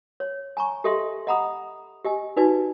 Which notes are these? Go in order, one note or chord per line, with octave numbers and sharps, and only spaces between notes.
C#5
G#5 A#5 C#6
G4 A4 D#5 E5 C6
D#5 F#5 A#5 B5 D#6
G4 D#5 G#5
D#4 F#4 B4 D5 G#5